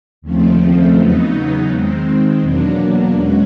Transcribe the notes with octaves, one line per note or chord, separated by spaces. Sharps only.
D#2 C#3 F3 A3 C4
E2 C#3 F#3 B3 D#4
D#3 G#3 C4
E2 B2 F#3 A#3 D4
B2 G#3 C#4 F#4